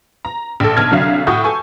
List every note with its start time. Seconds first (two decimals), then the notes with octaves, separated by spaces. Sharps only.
0.25 A#5
0.60 A#1 A4
0.77 B1 A5 F6 G#6
0.91 C2 D3 F#3 E5 F5
1.27 A2 F#4 C#6 D#6 G6
1.44 A4 G#5 C#6